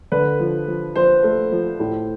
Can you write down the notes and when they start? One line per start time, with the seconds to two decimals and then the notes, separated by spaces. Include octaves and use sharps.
0.12 D3 B4
0.40 F3
0.68 F3
0.96 F3 C5
1.24 A3
1.52 F3
1.80 A2